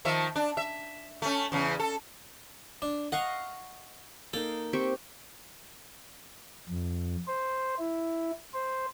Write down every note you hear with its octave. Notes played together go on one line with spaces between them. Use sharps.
D#3 F3 E5
D4
E5
A3 C#4
E2 C#3
A4
D4
D#5 F5 F#5 C#6
A#3 D#4 A4
C4 G4 C#6
F2
C5
E4
C5